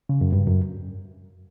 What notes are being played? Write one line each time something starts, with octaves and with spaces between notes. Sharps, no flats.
C#3
F#2
G2
F#2